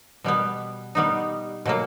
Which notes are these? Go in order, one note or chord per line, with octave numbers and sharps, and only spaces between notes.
B2 G3 B3
G3 B3 D#4
B2 F#3 A#3